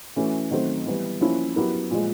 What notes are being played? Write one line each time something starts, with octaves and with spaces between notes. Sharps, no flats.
E3 A3 C#4 F#4
D#3 F#3 A3 C4
E3 G3 B3
F3 A#3 C#4 E4
F#3 B3 E4 G4 A#4
A#2 F3 G#3